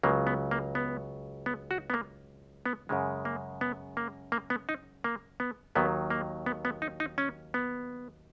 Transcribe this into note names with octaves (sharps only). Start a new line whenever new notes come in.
C#2 C#3 F#3 A#3
B3
A#3
B3
B3
F#4
B3
A#3
B3
F#2 C#3 G#3
A#3
B3
A#3
A#3
B3
D#4
A#3
B3
D#2 D#3 F#3 B3
A#3
B3
B3
D#4
D#4
C#4
B3